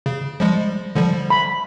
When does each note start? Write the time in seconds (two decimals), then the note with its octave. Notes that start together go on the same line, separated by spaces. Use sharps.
0.06 C#3
0.40 F3 G3 G#3
0.95 D3 F3 G3
1.30 B5